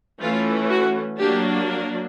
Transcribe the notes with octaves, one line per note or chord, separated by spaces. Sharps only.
E3 A3 C#4 F4
F#4
F#3 A#3 D4 G4
A#4